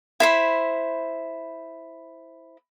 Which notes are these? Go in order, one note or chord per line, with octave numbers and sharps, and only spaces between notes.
E4 C5 B5